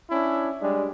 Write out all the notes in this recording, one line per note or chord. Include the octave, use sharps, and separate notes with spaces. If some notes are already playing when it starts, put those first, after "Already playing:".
C#4 D4 E4
G3 G#3 D4